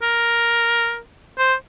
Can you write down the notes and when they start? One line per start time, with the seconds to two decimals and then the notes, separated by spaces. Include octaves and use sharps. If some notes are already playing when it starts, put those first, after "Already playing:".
0.02 A#4
1.38 C5